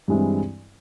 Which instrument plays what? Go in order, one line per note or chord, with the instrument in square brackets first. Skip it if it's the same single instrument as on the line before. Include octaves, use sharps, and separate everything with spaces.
[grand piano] G2 E3 G#3 C4 E4